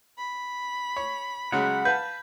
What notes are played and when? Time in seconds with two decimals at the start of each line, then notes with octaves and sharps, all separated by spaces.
0.18 B5
0.97 C#5
1.52 C#3 F#3 G#3 F#5
1.85 B4 F5 A5 G6